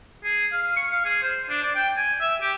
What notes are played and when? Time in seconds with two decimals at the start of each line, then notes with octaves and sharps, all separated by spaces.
0.24 G#4
0.52 F5
0.76 C#6
0.92 F5
1.05 G#4
1.22 C5
1.49 D4
1.63 D5
1.75 G5
1.96 G#5
2.21 E5
2.41 G4